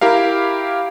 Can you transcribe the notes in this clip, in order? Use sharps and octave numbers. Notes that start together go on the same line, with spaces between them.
E4 G4 A#4 F5